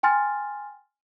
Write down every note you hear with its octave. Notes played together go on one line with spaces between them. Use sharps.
G5 G#5 C6 F6 A6